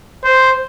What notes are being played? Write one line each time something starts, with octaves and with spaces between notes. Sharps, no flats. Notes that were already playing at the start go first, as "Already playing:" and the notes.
C5